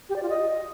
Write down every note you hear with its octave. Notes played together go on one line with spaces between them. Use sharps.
G4
D5
F4
D#5